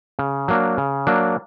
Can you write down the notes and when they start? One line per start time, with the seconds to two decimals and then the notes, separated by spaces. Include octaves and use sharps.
0.19 C#3
0.48 F#3 A#3 D4
0.78 C#3
1.07 F#3 A#3 D4